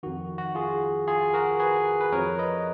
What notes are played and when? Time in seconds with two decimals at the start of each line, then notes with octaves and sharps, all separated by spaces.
0.03 F2 D#3 F#4
0.38 F#4
0.55 F4 G#4
1.08 F4 G#4
1.34 F#4 A#4
1.60 G#4 B4
2.01 B4
2.12 F2 F3 A#4 C#5
2.38 B4 D#5